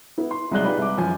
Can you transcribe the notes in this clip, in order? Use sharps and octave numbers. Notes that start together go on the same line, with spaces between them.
B3 E4
C6
C2 F#3 G#3 D5 F#6 G7
D#4 F4 G4 G#4 B4 D5
C2 D6
F#2 F3 G#5